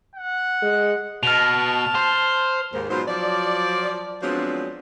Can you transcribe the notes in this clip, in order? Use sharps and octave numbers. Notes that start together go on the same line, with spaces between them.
F#5
G#3
B2 A5 F6 F7
C5
D#2 G#2 A#3
G#2 B2 F#3 F4 C5
F3 F#3 D5
F3 F#3 G#3 B3 C4 D4